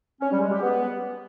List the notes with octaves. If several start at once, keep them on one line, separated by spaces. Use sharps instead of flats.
C#4
G3
G#3
G4
B3